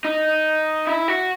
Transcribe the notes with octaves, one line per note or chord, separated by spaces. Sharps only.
D#4
E4
F#4